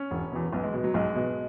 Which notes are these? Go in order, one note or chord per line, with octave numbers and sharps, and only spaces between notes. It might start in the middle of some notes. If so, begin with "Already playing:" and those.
Already playing: C#4
E1
E2 B2
B1 B3
G#3
B2
F#3
B1 G#3
B2